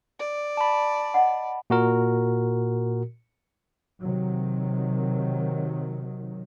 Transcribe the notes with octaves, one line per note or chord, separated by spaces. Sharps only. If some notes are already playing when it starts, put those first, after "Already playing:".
D5
A5 B5
D#5 F#5
A#2 F#4 A#4
C3 D#3 F#3